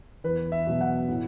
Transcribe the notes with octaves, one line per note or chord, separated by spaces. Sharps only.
E2 B4
E5
B2 F#3
F#5
A2